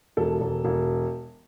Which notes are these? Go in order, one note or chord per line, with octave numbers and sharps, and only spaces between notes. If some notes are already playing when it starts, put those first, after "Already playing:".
E1 A4
E1
E1